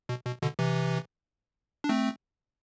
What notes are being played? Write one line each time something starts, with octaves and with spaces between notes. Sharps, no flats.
B2
B2
B2 D3
C3 E3
D4
A3 C4